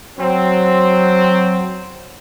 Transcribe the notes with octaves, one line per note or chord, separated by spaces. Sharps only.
F#3 C4